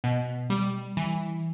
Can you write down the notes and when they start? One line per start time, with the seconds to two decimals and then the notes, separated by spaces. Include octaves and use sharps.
0.04 B2
0.50 G3
0.97 E3